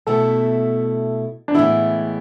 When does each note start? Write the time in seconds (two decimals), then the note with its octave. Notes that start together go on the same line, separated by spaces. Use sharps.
0.07 B2 A3 E4 A4
1.48 D4
1.54 A2 E3 G#3 B3 E4